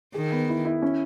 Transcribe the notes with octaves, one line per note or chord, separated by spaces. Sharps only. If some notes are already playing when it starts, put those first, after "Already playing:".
D#3 G#4
B3
E4
E4
C#4